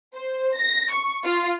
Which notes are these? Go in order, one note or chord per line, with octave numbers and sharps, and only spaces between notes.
C5
A#6
C#6
F4